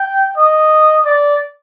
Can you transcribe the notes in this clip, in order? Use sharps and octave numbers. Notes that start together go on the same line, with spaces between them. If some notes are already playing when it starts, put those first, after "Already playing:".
Already playing: G5
D#5
D5